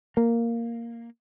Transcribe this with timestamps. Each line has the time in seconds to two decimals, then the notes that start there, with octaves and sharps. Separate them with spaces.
0.17 A#3